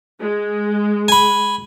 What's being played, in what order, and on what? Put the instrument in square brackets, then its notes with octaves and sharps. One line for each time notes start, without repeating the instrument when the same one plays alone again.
[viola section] G#3
[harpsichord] G#5 B5